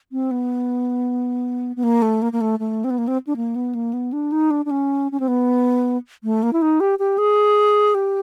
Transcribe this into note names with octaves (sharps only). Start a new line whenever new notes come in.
C4
B3
B3
A#3
A3
A#3
A#3
A3
A3
C4
B3
A#3
C4
D4
A#3
B3
A#3
B3
D4
D#4
D4
D4
C#4
C#4
C4
B3
A3
A#3
E4
D#4
G4
G4
G#4
G4